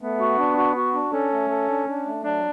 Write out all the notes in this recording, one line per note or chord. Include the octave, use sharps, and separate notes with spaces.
A3 B3
F#4
D4
F#4
F#4
D4
C#4 A4
A3
A4
D4
D4
A3
F#3 D4